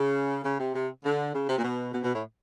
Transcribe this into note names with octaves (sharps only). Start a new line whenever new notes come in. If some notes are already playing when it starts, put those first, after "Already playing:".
Already playing: C#3
C#3
C3
C3
D3
C#3
C3
A#2
B2
B2
B2
A2